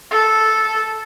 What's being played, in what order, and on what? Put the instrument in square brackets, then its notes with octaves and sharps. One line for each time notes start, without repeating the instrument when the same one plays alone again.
[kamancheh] A4